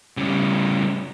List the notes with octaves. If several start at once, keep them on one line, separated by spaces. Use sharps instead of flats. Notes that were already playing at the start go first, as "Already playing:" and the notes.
C#3 G3